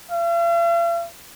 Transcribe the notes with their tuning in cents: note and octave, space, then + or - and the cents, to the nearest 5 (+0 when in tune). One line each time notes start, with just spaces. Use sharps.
F5 -45